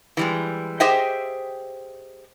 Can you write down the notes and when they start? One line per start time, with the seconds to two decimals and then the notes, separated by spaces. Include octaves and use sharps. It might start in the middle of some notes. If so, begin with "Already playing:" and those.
0.17 E3 G3 G#3
0.80 G4 G#4 C5 D#5 E5 G5